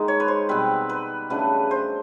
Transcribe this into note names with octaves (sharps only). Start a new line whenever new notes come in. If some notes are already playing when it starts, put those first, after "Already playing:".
Already playing: D#3 G#3 A#3 D#4
C#5
B4
C5
B2 G3 C4 B4
B4
C#3 F#3 A3 D4 B4
C5